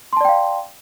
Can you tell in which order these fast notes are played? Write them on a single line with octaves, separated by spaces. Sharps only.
C6 A5 D5 G5 F5